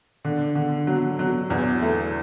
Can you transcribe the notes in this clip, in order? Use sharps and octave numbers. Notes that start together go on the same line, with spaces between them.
D3
D3
F#3
F#3
E2
A3